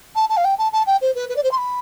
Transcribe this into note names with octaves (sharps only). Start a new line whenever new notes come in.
A5
A5
F5
G5
A5
A5
G5
C5
B4
B4
D5
C5
C6
B5